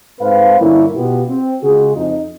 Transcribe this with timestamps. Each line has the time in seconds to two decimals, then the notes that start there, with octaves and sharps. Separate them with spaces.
0.21 G#2 C4 A4 B4 C5 F5
0.60 G2 D3 F3 A#3 C#4 E4
0.95 B2 B3 F4 G4
1.28 C4
1.63 C#3 G#3 F4 F#4 G#4
1.95 F2 D#4